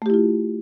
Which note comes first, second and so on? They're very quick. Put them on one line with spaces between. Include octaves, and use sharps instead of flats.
A3 G4 E4 F4